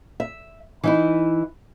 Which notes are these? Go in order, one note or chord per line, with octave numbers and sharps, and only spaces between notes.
E5
E3 D#4 E4